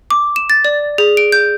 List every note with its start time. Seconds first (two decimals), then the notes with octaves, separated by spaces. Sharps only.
0.11 D6
0.36 E7
0.50 A6
0.65 D5
0.98 G#4
1.17 D7
1.32 G6